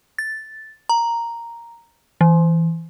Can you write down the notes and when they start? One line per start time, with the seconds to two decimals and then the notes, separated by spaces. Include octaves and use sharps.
0.18 A6
0.89 A#5
2.21 E3